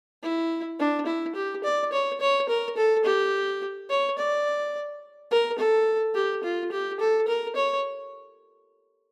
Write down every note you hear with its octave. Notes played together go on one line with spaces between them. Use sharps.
E4
D4
E4
G4
D5
C#5
C#5
A#4
A4
G4
C#5
D5
A#4
A4
G4
F4
G4
A4
A#4
C#5